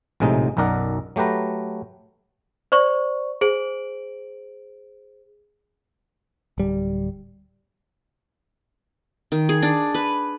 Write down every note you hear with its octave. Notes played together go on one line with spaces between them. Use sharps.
A#1 A2 C3 G#3 D#4
B1 F#2 D#4 A#4 D5 F#5
F#3 A3 G4 B4 A#5
C5 D5 C#6
G#4 C5 D7 F#7
D1 G3
D#3
G#4
D4
B4